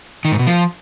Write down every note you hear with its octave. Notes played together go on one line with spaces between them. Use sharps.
D#3
G#2
B2
F3